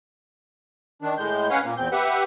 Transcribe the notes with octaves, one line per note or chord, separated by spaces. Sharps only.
D#3 D4
A2 G#3 G6
C#4 B4 C#5 F5 F#5
A#2 A#3
E2 C4 G6
G4 B4 E5 F#5